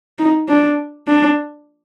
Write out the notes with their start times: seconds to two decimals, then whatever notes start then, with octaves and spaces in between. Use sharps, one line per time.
0.19 D#4
0.49 D4
1.08 D4